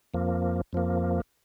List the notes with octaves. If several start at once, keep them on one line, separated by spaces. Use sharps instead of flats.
F2 F3 A#3
F2 F3 A#3